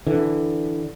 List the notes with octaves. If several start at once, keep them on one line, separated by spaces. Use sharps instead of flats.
D3 E3